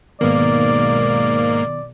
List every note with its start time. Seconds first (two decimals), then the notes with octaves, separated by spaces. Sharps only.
0.21 B1 G#2 D#3 A#3 B3 D5